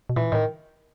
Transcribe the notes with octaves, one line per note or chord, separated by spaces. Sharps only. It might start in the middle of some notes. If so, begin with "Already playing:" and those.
B2
A#2 E3
A2 D#3